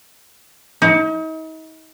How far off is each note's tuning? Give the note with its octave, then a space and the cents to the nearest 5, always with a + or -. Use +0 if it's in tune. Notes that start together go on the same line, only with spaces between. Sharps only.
D#4 +40